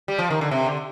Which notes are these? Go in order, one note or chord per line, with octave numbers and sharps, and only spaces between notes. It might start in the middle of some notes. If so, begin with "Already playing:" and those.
G3
F3
D#3
D3
C3
D3